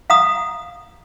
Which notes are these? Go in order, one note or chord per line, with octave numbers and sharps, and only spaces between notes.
F5 F#5 A#5 D#6